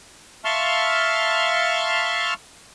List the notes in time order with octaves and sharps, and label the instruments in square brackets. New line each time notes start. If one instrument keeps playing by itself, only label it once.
[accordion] E5 F5 A5 C6 C#6 F6